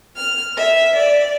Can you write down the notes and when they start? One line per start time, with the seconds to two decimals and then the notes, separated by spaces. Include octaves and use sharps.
0.16 F6
0.58 E5
0.97 D5